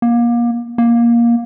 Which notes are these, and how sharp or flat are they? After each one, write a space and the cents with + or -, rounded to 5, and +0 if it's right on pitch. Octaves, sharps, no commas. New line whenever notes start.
A#3 +30
A#3 +15